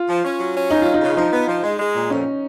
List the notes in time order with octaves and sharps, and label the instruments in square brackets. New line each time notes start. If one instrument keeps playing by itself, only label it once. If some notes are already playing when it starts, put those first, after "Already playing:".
Already playing: [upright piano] F4
[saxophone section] F3
C#4
F#3
C#4
[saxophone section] C#3 [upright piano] D#4
[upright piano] F4
[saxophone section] F#3
[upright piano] D#4
[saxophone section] C#3
[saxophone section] F3 [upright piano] D#4
[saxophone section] B3
F3
G#3
G#3
A#2
[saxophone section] F2 [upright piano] C#4